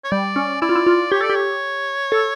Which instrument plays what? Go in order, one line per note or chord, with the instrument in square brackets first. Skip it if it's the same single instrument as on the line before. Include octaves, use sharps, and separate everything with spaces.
[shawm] C#5
[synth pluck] G3 [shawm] D5
[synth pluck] C#4
[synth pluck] E4 [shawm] D5
[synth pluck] F4
E4
F4
[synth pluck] G4 [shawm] C#5
[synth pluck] A4 [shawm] D5
[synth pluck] G4
[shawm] C#5
[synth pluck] A4